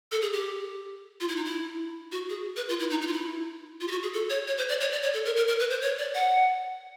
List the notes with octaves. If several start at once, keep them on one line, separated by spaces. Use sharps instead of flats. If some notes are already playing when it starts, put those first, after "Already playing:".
A4
G#4
G4
F4
E4
D#4
E4
F#4
G#4
B4
F4
E4
D#4
D#4
F4
E4
F4
G4
F#4
G#4
A4
C#5
C#5
C5
D5
C#5
D5
C#5
A4
A#4
A#4
A#4
B4
C5
C#5
D5
F#5